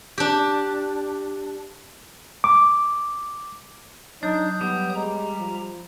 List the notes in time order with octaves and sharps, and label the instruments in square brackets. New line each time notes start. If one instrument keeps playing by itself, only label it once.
[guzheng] D4 G4
[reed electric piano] D6
[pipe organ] F#3 D#6 G6 [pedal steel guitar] D4 [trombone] D#4
[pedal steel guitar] G3 [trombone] B3
[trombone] G#3 [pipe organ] A#5
[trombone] F3